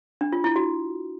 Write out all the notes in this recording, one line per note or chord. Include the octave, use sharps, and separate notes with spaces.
D4
F4
E4
F#4